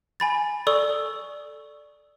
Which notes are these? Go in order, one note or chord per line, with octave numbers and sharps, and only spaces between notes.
G#5 B5 A6
A4 D5 C#6 D#6 E6